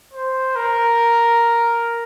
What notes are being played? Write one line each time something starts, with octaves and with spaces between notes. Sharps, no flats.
C5
A#4